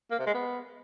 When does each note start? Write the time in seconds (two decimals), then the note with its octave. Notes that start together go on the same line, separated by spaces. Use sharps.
0.11 A#3
0.19 C3
0.27 G#3
0.34 B3